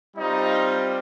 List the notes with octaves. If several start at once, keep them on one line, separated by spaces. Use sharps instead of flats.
G3 C4 D#4 F4 D#5